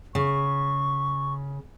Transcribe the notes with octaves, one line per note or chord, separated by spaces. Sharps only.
C#3 C#6